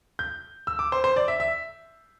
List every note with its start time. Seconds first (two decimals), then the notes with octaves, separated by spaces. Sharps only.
0.19 G6
0.67 E6
0.79 D6
0.92 C5
1.04 C5
1.16 D5
1.28 E5
1.40 E5